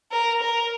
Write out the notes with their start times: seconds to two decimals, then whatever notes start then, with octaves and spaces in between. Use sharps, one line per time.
0.11 A#4
0.42 A#4